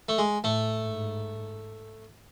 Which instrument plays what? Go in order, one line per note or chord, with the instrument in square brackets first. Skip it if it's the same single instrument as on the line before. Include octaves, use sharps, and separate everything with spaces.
[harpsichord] A3
G#3
[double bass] A2 [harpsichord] A3
[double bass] G#2